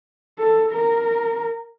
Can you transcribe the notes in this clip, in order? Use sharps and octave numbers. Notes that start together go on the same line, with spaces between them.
A4
A#4